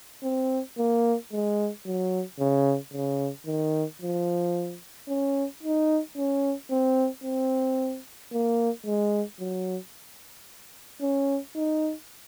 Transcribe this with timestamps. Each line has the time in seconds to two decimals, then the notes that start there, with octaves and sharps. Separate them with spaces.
0.23 C4
0.78 A#3
1.32 G#3
1.85 F#3
2.40 C#3
2.93 C#3
3.46 D#3
4.02 F3
5.08 C#4
5.63 D#4
6.17 C#4
6.71 C4
7.24 C4
8.33 A#3
8.86 G#3
9.40 F#3
11.02 C#4
11.56 D#4